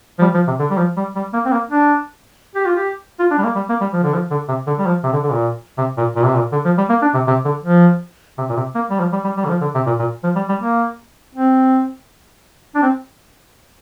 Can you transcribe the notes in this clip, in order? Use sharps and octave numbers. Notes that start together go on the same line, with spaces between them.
F3
G3
F3
C3
D3
G3
F3
G3
G3
A#3
C4
A#3
D4
G4
F4
G4
F4
D4
G3
A#3
G3
A#3
G3
F3
D3
F3
D3
C3
D3
G3
F3
C3
D3
D3
A#2
C3
A#2
A#2
C3
A#2
D3
F3
G3
A#3
D4
C3
C3
D3
F3
C3
A#2
C3
A#3
G3
F3
G3
G3
G3
D3
F3
D3
C3
A#2
A#2
F3
G3
G3
A#3
C4
D4
C4